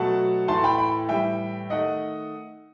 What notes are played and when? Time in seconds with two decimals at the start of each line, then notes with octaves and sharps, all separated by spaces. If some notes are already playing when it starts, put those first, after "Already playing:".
Already playing: B2 F#3 A3 F#5 A5
0.48 A2 E3 A3 A5 C6
0.64 G5 B5
0.78 G5 B5
1.09 A2 E3 G3 E5 G5
1.70 D#3 A3 D#5 F#5